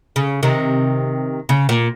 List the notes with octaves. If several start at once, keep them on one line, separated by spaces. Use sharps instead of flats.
C#3
C3 D#3
C#3
A#2